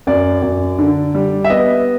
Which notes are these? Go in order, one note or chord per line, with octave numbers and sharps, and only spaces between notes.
F#2 D5
F#2
D3
G3
E5
B3 D#5